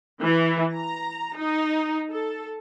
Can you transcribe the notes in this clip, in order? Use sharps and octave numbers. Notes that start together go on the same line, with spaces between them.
E3
A#5
D#4
A4